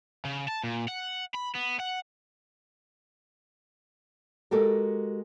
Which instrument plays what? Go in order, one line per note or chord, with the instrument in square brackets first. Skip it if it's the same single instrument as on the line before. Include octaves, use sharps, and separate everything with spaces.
[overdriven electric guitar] C#3
A5
A#2
F#5
B5
B3
F#5
[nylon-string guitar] G#3 F#4 G4 A4 A#4